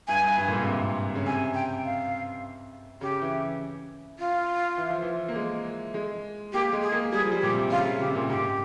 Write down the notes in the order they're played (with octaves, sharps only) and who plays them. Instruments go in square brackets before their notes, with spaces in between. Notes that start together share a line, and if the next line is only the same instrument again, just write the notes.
[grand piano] G2 [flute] G#5
[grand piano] G2
G2
A#2
G#2
C3
A#2
C#3
[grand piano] C3 [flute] G#5
[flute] G5
F5
[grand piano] C#3 [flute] G4
[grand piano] E3
[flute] F4
[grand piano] E3
F3
E3
A#3
G#3
G#3
[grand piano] A#3 [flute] G4
[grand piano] G#3
[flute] G#4
[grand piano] A#3
[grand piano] G3 [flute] G#4
[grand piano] F3
G3
[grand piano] A#2 [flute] G4
[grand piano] C3
[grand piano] C#3 [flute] F4
[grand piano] C#3
[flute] G4
[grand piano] C3
A#2
[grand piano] G#2 [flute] G4